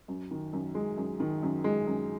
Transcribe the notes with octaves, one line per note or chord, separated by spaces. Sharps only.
F#2
D#3
F#2
G#3
F#2
D#3
F#2
G#3
F#2